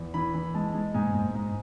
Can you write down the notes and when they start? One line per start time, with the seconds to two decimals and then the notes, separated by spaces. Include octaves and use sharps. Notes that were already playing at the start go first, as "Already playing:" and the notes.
Already playing: E2
0.14 E3 B5
0.34 E3
0.54 G#3 A5
0.74 G#3
0.94 G#2 G#5
1.14 G#2
1.35 G#2